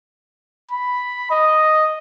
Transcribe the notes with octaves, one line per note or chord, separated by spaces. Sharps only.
B5
D#5